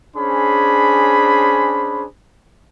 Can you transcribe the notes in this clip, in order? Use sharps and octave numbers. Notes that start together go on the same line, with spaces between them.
C#4 D4 G#4 C5 B5